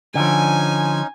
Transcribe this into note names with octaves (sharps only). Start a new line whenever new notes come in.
D3 F3 C#4 D#4 G#5